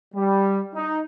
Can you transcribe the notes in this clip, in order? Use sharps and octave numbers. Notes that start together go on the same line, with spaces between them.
G3
D#4